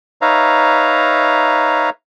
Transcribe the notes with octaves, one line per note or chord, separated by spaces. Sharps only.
D#4 B4 C#5 E5 F5 A#5